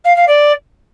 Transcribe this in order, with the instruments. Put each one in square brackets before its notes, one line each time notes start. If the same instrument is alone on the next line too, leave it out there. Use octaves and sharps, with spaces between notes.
[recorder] F5
F5
D5